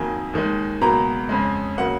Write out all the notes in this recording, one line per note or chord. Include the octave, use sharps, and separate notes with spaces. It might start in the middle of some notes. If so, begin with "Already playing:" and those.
Already playing: F2 D#3 F#3 A#3 G#5
D#2 D#3 G#3
C#2 B2 F#3 A#3 A#5
F2 C#3 G#3
C#3 F#3 A#3 F#5